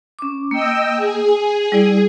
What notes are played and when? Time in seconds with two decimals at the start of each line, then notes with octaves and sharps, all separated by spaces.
0.19 C#4 D6
0.51 A#3 D#5 G5 E6
0.95 G#4
1.29 G#5
1.72 G3 E4 D5